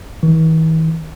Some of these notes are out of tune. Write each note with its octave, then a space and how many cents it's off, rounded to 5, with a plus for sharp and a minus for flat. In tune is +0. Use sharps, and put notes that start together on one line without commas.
E3 -45